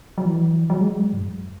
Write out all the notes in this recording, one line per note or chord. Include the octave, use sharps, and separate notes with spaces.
F#3
E3
F#3
G#3
F#3
G#2
F#2